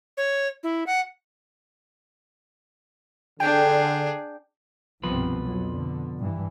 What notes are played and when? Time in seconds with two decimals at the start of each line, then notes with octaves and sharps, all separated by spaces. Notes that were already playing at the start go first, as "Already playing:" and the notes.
0.17 C#5
0.63 E4
0.87 F#5
3.40 D3 D4 G#4 G5
5.04 C2 G2 B2 F3 C4 B4
5.41 F2 F#3
5.71 D3
6.19 G2 E3